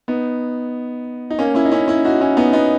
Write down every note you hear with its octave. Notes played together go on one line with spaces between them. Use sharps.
B3 D#4
D#4
A#3 C#4
C#4 E4
D#4
C#4 E4
C#4 E4
D#4 F#4
C#4 E4
B3 D#4
B3 D#4